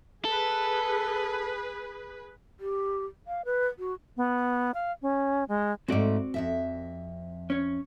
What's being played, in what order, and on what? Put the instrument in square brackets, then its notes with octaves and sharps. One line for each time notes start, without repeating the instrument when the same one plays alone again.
[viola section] G#4 B4 [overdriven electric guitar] A4
[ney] G4
F5
B4
F#4
[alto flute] B3
F5
C#4
G#3
[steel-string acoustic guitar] G#2 A3 [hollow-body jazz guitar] C4 F#4 D5
[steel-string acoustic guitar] F2 B2 E5
[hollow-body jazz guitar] C#4 C#5